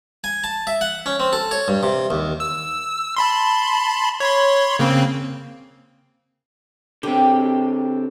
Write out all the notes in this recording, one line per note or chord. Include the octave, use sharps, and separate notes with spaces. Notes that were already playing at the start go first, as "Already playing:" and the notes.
G#5
A5
E5
F#5
C#4
C4
A4
C#5
G2
C3
D#2
E6
A5 B5 C6
C#5 B5 C6
C#3 A#3 C4
D3 C4 G4